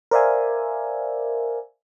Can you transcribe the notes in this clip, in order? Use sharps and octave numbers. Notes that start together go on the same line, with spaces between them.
A#4 C5 D5 E5 F5 G#5